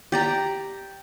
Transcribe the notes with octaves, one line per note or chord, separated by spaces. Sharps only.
G4 D5 A#5